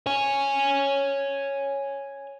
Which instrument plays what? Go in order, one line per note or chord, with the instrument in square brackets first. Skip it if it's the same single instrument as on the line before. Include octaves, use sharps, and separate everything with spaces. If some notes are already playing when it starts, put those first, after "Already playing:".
[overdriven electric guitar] C#5 G#5